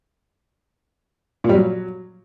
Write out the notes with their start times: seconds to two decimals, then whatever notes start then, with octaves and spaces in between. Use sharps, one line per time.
1.44 A#2
1.49 G3
1.55 F#3